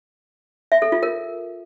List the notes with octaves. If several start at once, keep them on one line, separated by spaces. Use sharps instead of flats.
E5
A4
F4
A#4